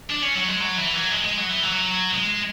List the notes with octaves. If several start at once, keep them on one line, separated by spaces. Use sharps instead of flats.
D4
C#4
F#3
G#3
F#3
E3
F#3
G#3
G#3
F#3
E3
F#3
G#3